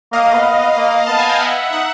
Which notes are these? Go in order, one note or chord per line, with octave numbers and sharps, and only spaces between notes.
A#3 D#5 F5
A#3
B3
B3
A#3
B3 A5
G#5
G5
B3 E5 F#5
D#4 E5 F#5